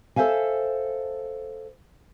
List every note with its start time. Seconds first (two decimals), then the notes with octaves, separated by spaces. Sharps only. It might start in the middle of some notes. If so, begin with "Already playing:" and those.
0.16 A4 C5 E5 F5 G#5